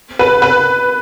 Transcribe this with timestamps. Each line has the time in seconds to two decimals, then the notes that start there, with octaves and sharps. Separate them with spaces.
0.19 B4
0.42 B4